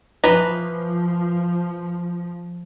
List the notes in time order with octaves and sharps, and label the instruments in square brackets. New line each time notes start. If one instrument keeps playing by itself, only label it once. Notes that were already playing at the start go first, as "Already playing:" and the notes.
[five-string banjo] E3 B4 A#5 [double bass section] F3